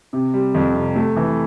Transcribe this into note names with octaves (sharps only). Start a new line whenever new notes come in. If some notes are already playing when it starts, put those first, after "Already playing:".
C3
G3
F2
C3
A3
E3